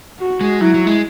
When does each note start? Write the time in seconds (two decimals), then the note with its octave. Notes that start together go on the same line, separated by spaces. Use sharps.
0.20 F#4
0.41 G#3
0.60 F#3 E4
0.74 F#3
0.87 G#3